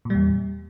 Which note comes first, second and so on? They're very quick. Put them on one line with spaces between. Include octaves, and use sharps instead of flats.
A#2 G3 E2